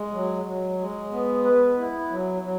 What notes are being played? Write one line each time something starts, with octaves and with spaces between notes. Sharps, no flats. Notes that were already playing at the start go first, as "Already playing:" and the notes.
Already playing: G#3
F#3
F#3
G#3
B3
B4
E4
F#3
F#3